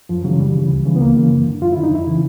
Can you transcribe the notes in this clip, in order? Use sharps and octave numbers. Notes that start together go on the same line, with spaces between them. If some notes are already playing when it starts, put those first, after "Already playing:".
F#2 F3
C#3 E3 F#3
F#2 G3
C#3 E3
C#2
C#3 E3
B3
C#2 A#3
C#3 E3
F#2
D3
F#2 F4
D3 E4
D#4
F2 E4
C#3 E3